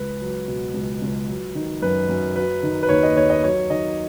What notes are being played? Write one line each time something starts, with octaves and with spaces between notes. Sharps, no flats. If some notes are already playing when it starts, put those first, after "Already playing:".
Already playing: C#2 B4
F#3
B2
C#2
C#2
F#3
D#3
F#2 B4
F#2
F#3 B4
D#3
B4
D#2 C#5
D#5
D#2 C#5
D#5
F#3 C#5
D#3 D#5